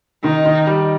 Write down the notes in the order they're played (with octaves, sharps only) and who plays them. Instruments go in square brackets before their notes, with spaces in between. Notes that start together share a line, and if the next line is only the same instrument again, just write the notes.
[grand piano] D#3 [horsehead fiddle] D#4
[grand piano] D#3
G3